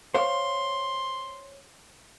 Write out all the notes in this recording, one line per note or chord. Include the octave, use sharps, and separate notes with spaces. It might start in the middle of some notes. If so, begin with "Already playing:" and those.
C5 C#5 F5 C6